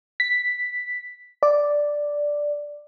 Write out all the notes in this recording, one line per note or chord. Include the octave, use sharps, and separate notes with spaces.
B6
D5